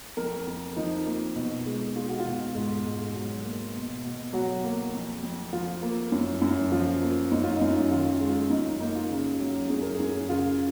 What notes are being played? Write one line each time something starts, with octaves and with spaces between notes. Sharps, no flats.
F2 A#4
F2
F3 D#4
A#3
B2
G#3
G#3 F4
F#4
F4
B2
G#2
G#2
F#3
A#3
B2
B2
F#3 F#4
A#3
F2
F2
F3 F4
A#3
F#2
F#2
F3 F4
A#3
F#2 D#4
F4
F#2 D#4
D#3 F4
G#3 F4
F#2 D#4
A#3 D#4
F4
C#3
F#3
F#2 G#4
A#4
G#4
F#2
C#3 F4